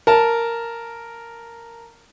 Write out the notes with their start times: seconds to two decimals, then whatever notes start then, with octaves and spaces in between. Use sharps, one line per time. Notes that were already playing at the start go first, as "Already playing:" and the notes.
0.07 A#4 A5